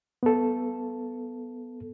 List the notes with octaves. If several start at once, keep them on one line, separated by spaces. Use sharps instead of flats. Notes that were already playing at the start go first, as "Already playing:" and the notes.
B3 A4